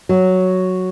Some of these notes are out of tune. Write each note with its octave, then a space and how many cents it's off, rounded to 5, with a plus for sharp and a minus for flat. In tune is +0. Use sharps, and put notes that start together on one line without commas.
F#3 +0